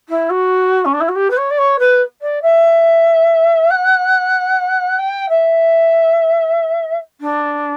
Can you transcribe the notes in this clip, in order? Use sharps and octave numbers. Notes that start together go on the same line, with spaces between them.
E4
F#4
C#4
D4
E4
F#4
G4
B4
C#5
D5
C#5
B4
D5
E5
F#5
G5
E5
D4